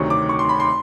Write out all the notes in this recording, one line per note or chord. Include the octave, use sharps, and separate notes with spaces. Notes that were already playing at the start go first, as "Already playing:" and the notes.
Already playing: D2 C3 D#3 F#3 C#6
D6
C#6
C6
B5
C6